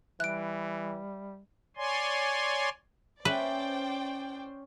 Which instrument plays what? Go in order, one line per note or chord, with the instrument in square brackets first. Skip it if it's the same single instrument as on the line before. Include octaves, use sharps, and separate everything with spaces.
[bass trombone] E3 [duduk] G3 [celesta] E5 [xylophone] F#6 D7
[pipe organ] C#5 D5 G#5 C6
[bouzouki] A2 E5 [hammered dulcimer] C#4 [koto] B4 [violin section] C5 D5 G5